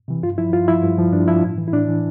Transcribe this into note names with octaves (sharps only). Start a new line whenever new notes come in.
C3 E3
G2 F4
F3 E4
G2 F4
F3 E4
G2
F3
G2 D4
F3 E4
A2
E3
E4
A2 D4
E3